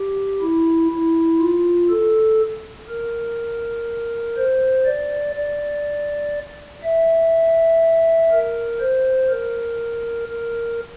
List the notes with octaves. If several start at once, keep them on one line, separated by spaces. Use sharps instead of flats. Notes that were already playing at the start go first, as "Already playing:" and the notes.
Already playing: G4
E4
E4
F4
A4
A#4
C5
D5
D5
E5
A#4
C5
A#4
A#4